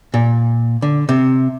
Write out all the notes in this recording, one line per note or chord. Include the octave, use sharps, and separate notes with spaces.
A#2
D3
C3